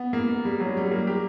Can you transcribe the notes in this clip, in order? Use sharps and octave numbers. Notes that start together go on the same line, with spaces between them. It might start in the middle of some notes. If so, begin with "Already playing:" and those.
Already playing: B3
A#3
G3
F#3
G3
A#3
G4